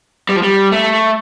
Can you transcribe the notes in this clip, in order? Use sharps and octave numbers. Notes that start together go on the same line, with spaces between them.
G3
F3
G3
A3